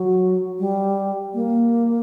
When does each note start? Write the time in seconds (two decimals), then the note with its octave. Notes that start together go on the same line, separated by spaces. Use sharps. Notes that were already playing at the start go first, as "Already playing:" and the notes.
Already playing: F#3
0.59 G3
1.34 A#3